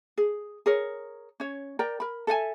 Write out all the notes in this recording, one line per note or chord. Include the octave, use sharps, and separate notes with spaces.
G#4
G#4 A#4 C#5
C#4 C#5
A#4 D5 G5 A#5
A#4 B5
A4 E5 F#5 G#5